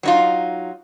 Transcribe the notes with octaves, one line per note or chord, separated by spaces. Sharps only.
F#3 D#4 F4